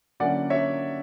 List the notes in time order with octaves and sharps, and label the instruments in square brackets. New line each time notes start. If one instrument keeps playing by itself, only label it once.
[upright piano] D3 F#3 A#3 C#4 E4 D5 F#5
C#5 E5